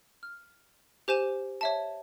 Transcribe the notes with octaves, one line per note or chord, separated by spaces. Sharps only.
F6
G4 C5 G#5 E7
C#5 E5 A5